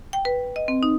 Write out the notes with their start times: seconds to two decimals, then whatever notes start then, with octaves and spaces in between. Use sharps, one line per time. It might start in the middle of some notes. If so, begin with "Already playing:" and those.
0.13 G5
0.25 B4
0.56 D#5
0.68 C4
0.83 D#4